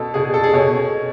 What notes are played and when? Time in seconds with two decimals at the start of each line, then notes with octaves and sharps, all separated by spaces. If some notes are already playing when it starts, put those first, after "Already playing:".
Already playing: B2 A4
0.14 B2 G#4
0.25 G#4
0.34 A4
0.44 G#4
0.53 B2 C#5